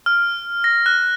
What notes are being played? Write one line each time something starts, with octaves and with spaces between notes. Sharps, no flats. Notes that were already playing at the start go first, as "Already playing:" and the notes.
F6
A#6
F#6